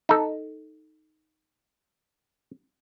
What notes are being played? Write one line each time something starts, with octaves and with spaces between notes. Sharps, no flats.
D#4 A4